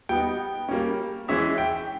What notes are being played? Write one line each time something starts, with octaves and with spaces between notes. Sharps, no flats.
G3 B3 D#4 G5
G3 A#3 C#4
E3 G#3 C#4 E4 E5
G5